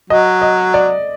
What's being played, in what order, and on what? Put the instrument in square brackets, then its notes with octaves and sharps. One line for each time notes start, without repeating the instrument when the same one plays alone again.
[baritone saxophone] F#3 [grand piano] D#5
[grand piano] D#5
D5